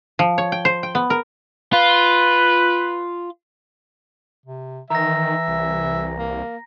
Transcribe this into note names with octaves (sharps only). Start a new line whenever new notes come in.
F3
C#5
G5
C5
G5
B3
A#4
F4 B4
C3
D#3 E3 E5 A#5 A#6
C2
A#3